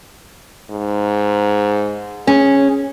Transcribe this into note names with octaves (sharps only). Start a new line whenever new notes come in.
G#2
C#4 G#4